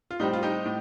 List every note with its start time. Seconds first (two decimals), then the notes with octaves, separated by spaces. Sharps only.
0.11 F4
0.20 A2 G3 C4 D#4
0.33 F4
0.43 D#4 G4
0.65 A2